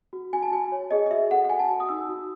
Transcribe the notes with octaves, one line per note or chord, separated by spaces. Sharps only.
F#4
F#4 G#5
A5
F#4 G#5
C#5
G#4 D#5
D#5
F#4 E5
A4 F#5
F#5
F#4 G#5
A5
F#4
D#6
D#4 E6
F#4